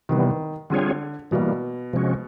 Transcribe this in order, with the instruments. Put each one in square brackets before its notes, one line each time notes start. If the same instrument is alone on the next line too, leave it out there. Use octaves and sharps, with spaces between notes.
[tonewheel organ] C3 E3 G3 B3 [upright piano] D#3
[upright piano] D3 [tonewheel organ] G3 C4 F4 G#4 C#5
[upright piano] B2 [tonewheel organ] E3 G3 A#3
[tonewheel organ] C3 F3 G#3 C#4 F#4